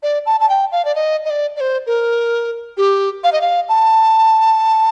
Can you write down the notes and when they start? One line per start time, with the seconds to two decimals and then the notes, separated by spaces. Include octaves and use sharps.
0.03 D5
0.26 A5
0.40 A5
0.49 G5
0.72 F5
0.85 D5
0.95 D#5
1.25 D#5
1.30 D5
1.56 D5
1.60 C5
1.87 A#4
2.77 G4
3.24 F5
3.33 D#5
3.41 F5
3.69 A5